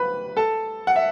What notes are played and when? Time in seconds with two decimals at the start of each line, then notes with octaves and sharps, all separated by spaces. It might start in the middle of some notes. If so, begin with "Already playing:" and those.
Already playing: B4 B5
0.37 A4 A5
0.87 F#5
0.96 E5